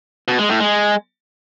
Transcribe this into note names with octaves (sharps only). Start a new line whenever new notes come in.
B2
G#3
A2
G#3